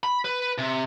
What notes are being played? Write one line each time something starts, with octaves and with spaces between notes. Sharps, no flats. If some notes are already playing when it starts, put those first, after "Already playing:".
B5
B4
C3